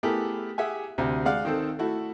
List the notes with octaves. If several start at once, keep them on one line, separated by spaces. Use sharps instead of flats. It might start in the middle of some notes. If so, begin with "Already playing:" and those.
A3 B3 E4 G4 G#4 A#4
G4 G#4 E5 F#5 G#5
D2 C3
G#3 D5 F5 F#5
D#3 C4 A4
A3 E4 F#4